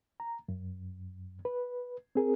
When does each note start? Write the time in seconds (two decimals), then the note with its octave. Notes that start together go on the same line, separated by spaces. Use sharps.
0.20 A#5
0.49 F#2
1.45 B4
2.15 C4 G#4 A#4